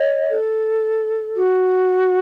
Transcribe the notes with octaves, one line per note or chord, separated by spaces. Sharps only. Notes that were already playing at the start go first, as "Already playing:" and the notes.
Already playing: C#5 D#5
A4
F#4